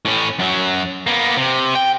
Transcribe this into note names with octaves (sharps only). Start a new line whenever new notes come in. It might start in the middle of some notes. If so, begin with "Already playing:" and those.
A2 C#4
F#2 F#3
A#3 B3
C3
G5